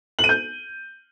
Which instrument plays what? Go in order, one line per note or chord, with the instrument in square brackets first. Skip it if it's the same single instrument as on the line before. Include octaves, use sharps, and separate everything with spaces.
[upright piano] F#7
D#7
G6